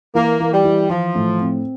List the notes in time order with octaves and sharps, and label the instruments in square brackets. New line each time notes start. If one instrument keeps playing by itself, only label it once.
[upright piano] E3 [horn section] A#3
[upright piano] E3
[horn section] G3
[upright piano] E3
[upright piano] E3 [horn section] F3
[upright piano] A2
C4